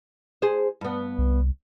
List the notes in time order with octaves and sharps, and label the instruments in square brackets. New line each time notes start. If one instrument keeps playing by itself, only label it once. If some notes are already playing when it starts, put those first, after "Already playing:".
[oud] G#4 C5
G2 B3
[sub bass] C2